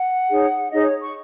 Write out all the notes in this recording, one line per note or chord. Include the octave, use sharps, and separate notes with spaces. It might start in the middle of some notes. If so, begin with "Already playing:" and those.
Already playing: F#5
D#4 G#4 C#5
D#4 G#4 C#5 D#5
C#5
C#6